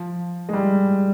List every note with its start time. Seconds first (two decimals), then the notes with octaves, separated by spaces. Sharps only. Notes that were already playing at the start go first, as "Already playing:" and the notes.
Already playing: F3
0.49 G#3
0.53 G3